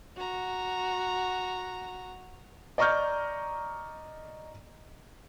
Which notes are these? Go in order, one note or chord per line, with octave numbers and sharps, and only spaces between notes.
F#4 A#5
D5 D#5 A#5 C#6 F6 G6